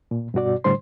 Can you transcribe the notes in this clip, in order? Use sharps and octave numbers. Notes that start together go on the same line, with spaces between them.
A#2
G2 B2 F#4 D5
A2 D3 G3 C5 C6